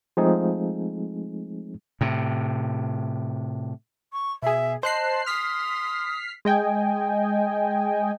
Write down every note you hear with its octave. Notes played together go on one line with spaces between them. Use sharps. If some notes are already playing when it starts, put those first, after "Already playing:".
F3 G#3 A3 C4 D#4 G#4
A2 C3
C#6
B2 G#4 E5
C5 D#5 A5 F#6 C7
C6 D#6 F6 B6 C7
G#3 D#5 G5 G#5